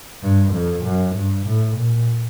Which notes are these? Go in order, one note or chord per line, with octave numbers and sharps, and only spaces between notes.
G2
F2
F#2
G2
A2
A#2